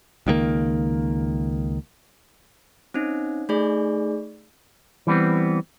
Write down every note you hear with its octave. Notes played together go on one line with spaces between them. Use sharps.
C#2 D#3 E3 A#3
C4 C#4 D#4
A3 D#4 G#4 D5
E3 G3 B3 C4